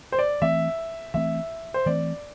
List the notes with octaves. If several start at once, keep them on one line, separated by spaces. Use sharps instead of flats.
C5
D5
E3 A3 C4 E5
E3 A3 C4 E5
C5
E3 A3 C4 D5